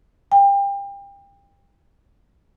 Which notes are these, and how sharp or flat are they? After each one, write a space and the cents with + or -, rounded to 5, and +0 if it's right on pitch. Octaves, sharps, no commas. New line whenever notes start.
G5 +30